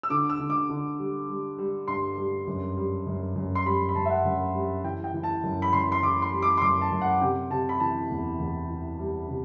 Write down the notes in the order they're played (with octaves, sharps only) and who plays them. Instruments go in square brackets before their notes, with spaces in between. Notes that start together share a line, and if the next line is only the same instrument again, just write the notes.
[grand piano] E6
D3 D6
E6
D3
D6
D3
G3
G3
G3
G2 C6
G3
F#2
G3
F#2
F#2
C6
G3 B5
B5
F#2 A5
E5
F#5
F#2
G3
E3 G5
G5
E3
A5
F#2
B5
F#2 C6
C6
E3 D6
C6
G3
D6
C6
F#2 D6
A5
F#2
F#5
C3 G5
C3 A5
B5
E3 A5
E2
E2
E3
G3
C3